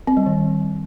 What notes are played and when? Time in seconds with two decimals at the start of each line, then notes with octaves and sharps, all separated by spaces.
0.07 C4
0.17 G3
0.26 D#3